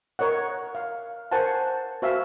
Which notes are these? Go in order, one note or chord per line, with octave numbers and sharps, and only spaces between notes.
A#4 C#5 D#5 F#5
F5
A#4 C5 F#5 G#5 A5
F#4 C5 E5 F5 G#5